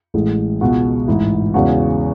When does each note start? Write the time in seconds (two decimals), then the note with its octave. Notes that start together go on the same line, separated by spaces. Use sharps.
0.14 A1 A2 G#3
0.61 C#2 B2 G#3 F#4
1.08 A1 G#2 E3 E4
1.54 E2 C#3 G#3 F#4